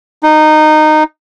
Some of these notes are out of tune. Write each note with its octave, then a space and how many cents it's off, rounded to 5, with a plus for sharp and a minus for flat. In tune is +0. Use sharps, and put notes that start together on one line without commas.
D#4 -15